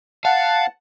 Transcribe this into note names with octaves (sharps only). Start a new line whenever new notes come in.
F5 F#5 A5